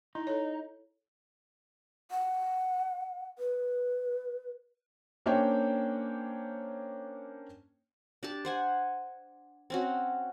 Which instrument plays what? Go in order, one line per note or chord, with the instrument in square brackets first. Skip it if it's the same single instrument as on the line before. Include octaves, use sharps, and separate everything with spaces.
[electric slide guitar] D#4 [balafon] E4
[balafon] A4 C#5
[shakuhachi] F#5
B4
[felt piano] A#3 C#4 D4 C5 C#5 G5
[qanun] D4 G4 A5
C5 F#5 G#5
C4 C#4 F#4